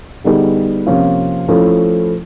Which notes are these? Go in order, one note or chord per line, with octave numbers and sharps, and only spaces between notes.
D3 G3 B3 D#4 G#4
C3 F3 A#3 C#4 F4
F3 A3 C#4 E4